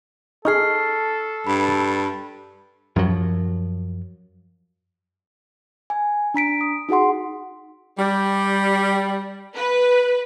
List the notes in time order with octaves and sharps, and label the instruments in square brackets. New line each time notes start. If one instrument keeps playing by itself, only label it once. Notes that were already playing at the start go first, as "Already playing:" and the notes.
[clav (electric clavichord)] D#4 G#4 [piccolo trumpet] A4 [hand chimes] C#6 F6 C7
[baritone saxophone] G2 [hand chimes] B5
[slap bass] F#2 F3 F#3
[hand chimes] G#5
D4 A#5 B6 D7
D#6
D#4 F#4 G#4 F#5 C6
[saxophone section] G3
[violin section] B4